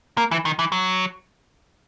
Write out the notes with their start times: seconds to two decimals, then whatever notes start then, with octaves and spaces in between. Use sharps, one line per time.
0.18 A#3
0.31 E3
0.45 D#3
0.59 E3
0.72 F#3